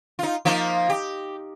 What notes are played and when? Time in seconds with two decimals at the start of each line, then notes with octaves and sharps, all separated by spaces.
0.19 D#4 F4
0.45 F3 A#3 D#4
0.89 G4